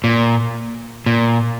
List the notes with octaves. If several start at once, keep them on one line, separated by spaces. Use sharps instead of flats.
A#2
A#2